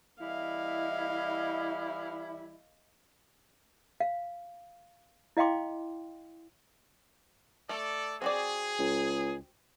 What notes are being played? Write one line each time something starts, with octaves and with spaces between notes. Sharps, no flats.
E3 G3 E4 D#5 F5
F5
E4 D#5 F5 G5 C6 D6
A3 A4 D5
C4 F#4 G#4 D5
C#2